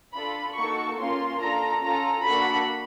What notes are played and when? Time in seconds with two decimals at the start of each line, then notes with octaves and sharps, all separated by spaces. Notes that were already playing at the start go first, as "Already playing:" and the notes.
0.14 D4 F4 A4 B5
0.56 A#3 D#4 F#4 A4 C#6
0.98 A#3 C#4 F4 C6
1.40 D4 F4 A4 A#5
1.81 C#4 F4 A4 A#5
2.23 A#3 D4 F#4 A4 B5